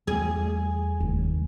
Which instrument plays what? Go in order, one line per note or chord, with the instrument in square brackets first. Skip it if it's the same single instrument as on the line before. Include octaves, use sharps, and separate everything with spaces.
[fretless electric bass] E2 A3 [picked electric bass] G3 [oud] G#4
[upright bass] F1 [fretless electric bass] D#2